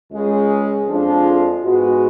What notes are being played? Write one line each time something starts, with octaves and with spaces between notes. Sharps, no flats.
C#2 C#3 G#3
F2 F3 G#3 D4 F4
G#2 G#3 B3 F#4